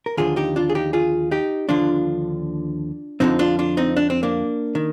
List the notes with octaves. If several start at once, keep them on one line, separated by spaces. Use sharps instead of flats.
A#4
D#2 D3 F3 F4 G#4
D#4 G4
D4 F4
G#4
D#4 G4
F4 G#4
D#4 G4
D#2 D3 F3 D4 F4
F2 D3 F3 C4 D#4
D4 F4
D4 F4
C4 D#4
D4
C4
A#3 D4
D#3